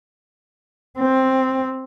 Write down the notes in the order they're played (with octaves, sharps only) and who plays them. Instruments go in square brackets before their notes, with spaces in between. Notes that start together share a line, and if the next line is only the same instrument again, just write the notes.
[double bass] C4